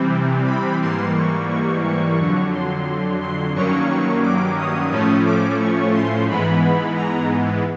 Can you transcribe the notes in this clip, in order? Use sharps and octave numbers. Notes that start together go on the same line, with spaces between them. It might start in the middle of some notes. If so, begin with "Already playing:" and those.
Already playing: C3 E3 G3 C4
B5
G#2 E3 G3 A#3 C6
C#6
C#6
C#6
F2 D3 F#3
C6
C6
G2 D#3 F#3 A#3 C#4 C#6
D6
D#6
A2 F3 A3 C#4
D6
C#6
C6
G#2 E3 G#3 B3 B5
A#5